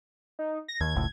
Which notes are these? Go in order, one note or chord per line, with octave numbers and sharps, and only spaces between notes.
D#4
A#6
D#2 G#6
F#1 C#2 A2